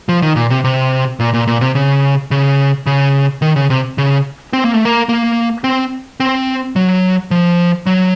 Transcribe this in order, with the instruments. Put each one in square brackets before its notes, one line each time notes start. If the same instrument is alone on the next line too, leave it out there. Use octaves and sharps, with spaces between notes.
[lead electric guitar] F3
D#3
A#2
C3
C3
A#2
A#2
A#2
C3
C#3
C#3
C#3
D#3
C#3
C3
C#3
C4
A#3
A3
A#3
A#3
C4
C4
F#3
F3
F#3